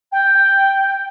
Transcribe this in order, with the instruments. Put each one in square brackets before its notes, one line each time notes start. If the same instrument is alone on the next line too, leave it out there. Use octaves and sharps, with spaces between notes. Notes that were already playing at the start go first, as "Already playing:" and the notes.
[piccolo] G5